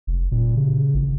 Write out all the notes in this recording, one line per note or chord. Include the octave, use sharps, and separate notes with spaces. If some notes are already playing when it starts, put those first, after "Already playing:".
F1
A#2
C#3
G#1